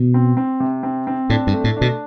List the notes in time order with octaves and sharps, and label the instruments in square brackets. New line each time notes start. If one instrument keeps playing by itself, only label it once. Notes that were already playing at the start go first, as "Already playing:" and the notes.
Already playing: [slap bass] B2
[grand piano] C4
C4
C3
C4
C4
[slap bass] A2 [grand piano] D4
[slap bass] G2
[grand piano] A3
[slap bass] A2
[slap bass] B2 [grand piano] D4